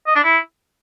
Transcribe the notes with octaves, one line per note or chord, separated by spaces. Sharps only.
D#5
D4
E4